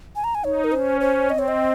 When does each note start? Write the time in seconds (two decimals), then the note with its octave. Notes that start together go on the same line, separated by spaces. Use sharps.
0.16 G#5
0.24 A#5
0.35 G#5
0.44 D#4 C#5
0.64 A#4
0.72 C#4 C5
1.01 C5
1.29 C4 D#5
1.39 C#5
1.48 D#5